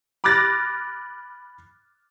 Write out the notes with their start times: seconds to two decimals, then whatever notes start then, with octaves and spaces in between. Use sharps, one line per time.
0.24 B5 D6 F6 F#6 A6 A#6